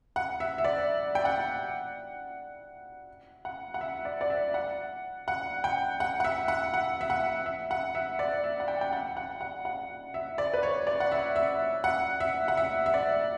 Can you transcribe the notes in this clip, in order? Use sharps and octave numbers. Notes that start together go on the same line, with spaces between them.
F#5
E5
E5
D5
G5
F#5
F#5
F#5
E5
D5
D5
E5
F#5
F#5
G5
F#5
F#5
E5
F#5
F#5
E5
F#5
E5
F#5
E5
D5
E5
F#5
G5
G5
F#5
F#5
F#5
F#5
E5
D5
B4
C#5
D5
F#5
E5
E5
F#5
E5
F#5
E5
E5
D5